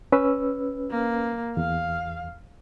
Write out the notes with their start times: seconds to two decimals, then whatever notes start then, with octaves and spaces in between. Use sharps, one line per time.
0.12 C#4 B4 E6
0.91 A#3
1.57 E2 F5